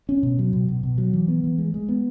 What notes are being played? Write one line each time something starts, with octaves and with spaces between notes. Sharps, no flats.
C#4
B2
F#3
B2
B2
B2
F#3
E3
B3
E3
G#3
G#3
B3